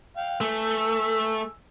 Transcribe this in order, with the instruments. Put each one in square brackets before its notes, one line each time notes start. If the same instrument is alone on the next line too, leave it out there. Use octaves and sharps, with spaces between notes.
[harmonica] F5 G5
[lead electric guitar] A3 [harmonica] G#5 E6